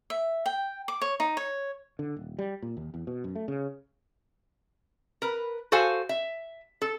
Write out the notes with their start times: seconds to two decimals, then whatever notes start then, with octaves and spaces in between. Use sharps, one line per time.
0.10 E5
0.46 G5
0.88 D6
1.01 C#5
1.20 D#4
1.37 C#5
1.99 D3
2.17 D#1
2.39 G3
2.62 A#2
2.77 D#2
2.94 E2
3.07 B2
3.24 F#2
3.36 A3
3.48 C#3
5.22 A#4 B4
5.72 F#4 A4 C5 F5 G#5
6.09 E5
6.82 A4